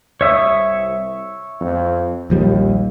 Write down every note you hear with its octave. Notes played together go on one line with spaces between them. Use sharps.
C2 C#5 E5 D#6
F2
A#1 D#2 F3 G3